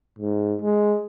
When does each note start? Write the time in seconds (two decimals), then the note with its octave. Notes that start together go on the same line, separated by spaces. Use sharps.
0.19 G#2
0.62 G#3